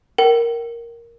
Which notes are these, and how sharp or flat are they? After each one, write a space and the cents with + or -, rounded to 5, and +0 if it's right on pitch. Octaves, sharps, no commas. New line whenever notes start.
A#4 +0 G5 -40